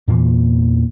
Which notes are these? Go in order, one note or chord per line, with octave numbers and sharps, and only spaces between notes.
E2 A#2 E3 A#3